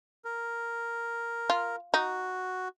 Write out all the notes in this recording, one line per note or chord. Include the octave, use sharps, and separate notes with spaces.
A#4
F4
D#4 F#4